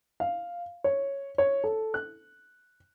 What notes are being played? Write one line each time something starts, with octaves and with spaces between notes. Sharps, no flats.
F5
C#5
C#5
A4
F#6